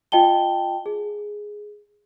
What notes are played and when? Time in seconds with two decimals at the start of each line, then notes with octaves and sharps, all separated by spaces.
0.12 F4 D#5 G5 A5 G7
0.86 G#4